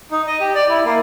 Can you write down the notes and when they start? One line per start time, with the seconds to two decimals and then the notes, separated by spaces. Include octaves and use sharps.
0.11 D#4
0.27 D#5
0.40 G4
0.55 D5
0.69 E4
0.85 A#3